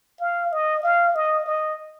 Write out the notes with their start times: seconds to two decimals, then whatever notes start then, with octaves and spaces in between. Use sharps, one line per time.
0.21 F5
0.52 D#5
0.83 F5
1.15 D#5
1.46 D#5